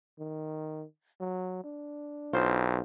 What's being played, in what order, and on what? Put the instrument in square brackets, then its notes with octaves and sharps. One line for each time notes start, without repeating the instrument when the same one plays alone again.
[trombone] D#3
F#3
D4
[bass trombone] B1 [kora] F4 C5